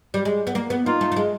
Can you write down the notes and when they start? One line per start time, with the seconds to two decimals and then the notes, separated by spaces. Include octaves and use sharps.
0.14 G3
0.25 G#3
0.47 B3
0.55 A#3
0.70 B3
0.86 A#3 D#4 F4
1.01 A3
1.12 A3
1.16 G#3